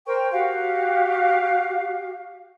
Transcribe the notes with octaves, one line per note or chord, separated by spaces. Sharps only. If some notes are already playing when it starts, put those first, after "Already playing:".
A#4 C5 G5 C#6
F#4 G4 F5